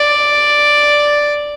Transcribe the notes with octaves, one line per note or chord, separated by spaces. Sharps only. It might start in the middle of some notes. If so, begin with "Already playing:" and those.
Already playing: D5